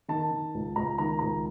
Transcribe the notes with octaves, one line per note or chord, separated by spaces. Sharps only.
D#3 A5
D#3
C#2
C#2 A#5
D#3 A#5
C#2 A#5